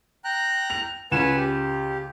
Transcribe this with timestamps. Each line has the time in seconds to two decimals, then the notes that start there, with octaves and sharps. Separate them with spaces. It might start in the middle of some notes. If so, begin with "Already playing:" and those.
0.24 G5 A#5 F#6
0.70 F7
1.12 C#2 B4 F#5 G#5 E7
1.37 G4